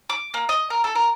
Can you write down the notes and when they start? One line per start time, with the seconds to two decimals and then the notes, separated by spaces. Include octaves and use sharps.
0.10 D6
0.34 A#3
0.49 D#5
0.70 A#4
0.84 A4
0.95 A#4